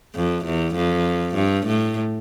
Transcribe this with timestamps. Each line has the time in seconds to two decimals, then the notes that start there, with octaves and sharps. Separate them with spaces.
0.15 F2
0.45 E2
0.75 F2
1.35 G2
1.66 A2